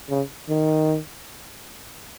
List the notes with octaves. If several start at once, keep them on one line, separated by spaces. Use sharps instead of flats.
C#3
D#3